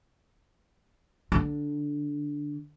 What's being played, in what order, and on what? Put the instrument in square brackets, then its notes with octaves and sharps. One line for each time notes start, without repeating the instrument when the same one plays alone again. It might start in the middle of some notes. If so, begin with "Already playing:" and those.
[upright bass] D3